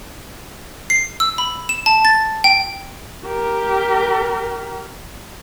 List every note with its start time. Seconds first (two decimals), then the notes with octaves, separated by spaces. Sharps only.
0.90 C7
1.20 E6
1.38 B5
1.69 E7
1.86 A5
2.05 A6
2.44 G5
3.26 G4 A#4